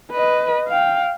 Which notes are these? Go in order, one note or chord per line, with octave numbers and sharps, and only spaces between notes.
B4 D#5
F5 G5